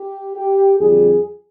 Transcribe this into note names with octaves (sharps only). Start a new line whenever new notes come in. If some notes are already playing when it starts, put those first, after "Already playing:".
Already playing: G4
G4
F2 D3 G3 G#4